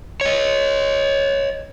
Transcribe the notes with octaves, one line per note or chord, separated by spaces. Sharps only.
C#5 D#5